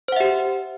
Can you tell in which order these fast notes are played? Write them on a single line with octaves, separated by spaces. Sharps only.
C5 F#5 E5 G4